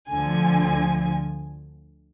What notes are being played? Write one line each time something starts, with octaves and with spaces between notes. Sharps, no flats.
D2 D3 F3 G#5